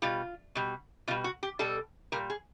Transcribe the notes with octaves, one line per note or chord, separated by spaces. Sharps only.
B2 G3 F4
B2 G3
B2 G3 F4
F#4
G4
B2 G3 A4
A#2 G3 A#4
G#4